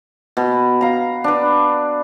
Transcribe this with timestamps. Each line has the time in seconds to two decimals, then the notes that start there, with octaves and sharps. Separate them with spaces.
0.37 B2
0.81 F5 A#5
1.24 D4 B4